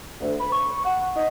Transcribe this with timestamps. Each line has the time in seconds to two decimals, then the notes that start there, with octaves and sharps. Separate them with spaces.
0.20 D2
0.40 B5
0.52 C#6
0.85 F#5
1.16 D#4